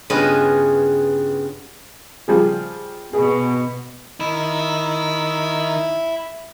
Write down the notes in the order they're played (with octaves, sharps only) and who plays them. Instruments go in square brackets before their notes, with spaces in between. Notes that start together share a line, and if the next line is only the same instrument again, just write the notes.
[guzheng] G2 C#3 B3 F4 G#4 D#5
[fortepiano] F3 G3 G#4
[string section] B2 [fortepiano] G#4
[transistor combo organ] D#3 [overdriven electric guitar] E4